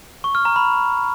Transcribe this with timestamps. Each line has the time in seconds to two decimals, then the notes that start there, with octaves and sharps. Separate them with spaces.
0.24 C#6
0.35 F6
0.45 A#5
0.56 B5